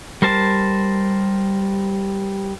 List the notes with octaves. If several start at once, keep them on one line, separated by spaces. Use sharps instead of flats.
G3 A#4 C5 A5